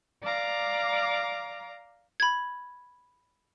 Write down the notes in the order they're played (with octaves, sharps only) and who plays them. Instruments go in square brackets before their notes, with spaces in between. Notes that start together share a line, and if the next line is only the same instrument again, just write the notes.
[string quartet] D5 F5 A#5 D6
[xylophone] B5 G#6